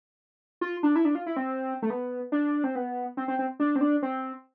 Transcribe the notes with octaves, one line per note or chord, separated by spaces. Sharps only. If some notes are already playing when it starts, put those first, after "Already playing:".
F4
D4
E4
D4
F4
E4
C4
A3
B3
D4
C4
B3
C4
C4
C4
D4
C4
D4
C4